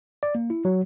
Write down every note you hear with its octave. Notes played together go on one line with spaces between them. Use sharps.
D5
A#3
E4
F#3